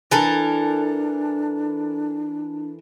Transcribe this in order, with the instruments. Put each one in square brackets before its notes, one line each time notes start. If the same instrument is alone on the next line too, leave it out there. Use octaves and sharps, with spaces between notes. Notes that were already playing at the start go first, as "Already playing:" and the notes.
[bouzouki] E3 A4 A#4 [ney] D4